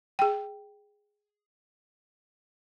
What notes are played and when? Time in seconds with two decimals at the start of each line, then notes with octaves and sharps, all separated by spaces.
0.19 G#4 G5